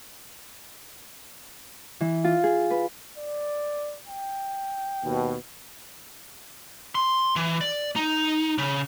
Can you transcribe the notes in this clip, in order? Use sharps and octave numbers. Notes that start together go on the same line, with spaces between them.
E3
F4
G#4
B4
D5
G5
D#2 B2
C6
E3
D5
D#4
C#3